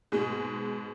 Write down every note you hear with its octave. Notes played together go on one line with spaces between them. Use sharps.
G#2 B2 G#3